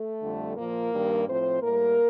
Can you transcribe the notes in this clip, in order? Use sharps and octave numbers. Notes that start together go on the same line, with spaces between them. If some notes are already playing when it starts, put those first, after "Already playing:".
Already playing: A3 A4
F2 D3 G3
A#2 F3 A#3 A#4
G2 D#3 G3
A2 F3 C4 C5
A2 G3 A#3 A#4